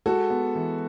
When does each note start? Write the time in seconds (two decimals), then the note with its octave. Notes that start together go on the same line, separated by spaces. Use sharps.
0.06 G#3 F#4 A4
0.30 B3
0.55 E3